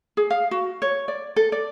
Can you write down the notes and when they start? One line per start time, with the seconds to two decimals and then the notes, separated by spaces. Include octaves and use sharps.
0.17 G#4
0.30 F5
0.51 F#4
0.82 C#5
1.08 D5
1.36 A4
1.52 D5